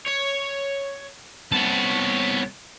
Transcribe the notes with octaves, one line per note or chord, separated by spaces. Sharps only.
C#5
C2 B3 C#5 A5